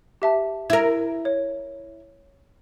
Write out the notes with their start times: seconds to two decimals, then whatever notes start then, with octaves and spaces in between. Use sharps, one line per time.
0.22 G4 E5 A5
0.70 E4 A#4
1.25 C#5